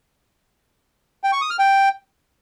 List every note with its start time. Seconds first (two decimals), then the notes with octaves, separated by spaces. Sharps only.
1.24 G5
1.32 C#6
1.41 D#6
1.50 F6
1.59 G5